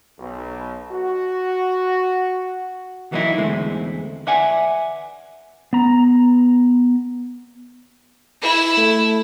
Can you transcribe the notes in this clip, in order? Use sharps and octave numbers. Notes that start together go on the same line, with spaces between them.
B1
F#4
E3 F#3 A#3 D#4 E4
E2 D3 G#3 A3 C4
B4 D5 E5 F#5 G#5
B3 A#5
E4
A3